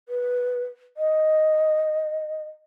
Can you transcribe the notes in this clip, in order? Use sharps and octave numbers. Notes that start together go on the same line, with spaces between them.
B4
D#5